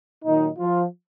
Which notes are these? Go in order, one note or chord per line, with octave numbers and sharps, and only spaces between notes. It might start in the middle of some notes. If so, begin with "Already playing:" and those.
A#2 D#3 F#3 D#4
F3 F4